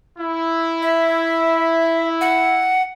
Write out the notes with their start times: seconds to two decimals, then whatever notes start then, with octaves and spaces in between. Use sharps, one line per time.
0.18 E4
0.82 E5
2.21 F#5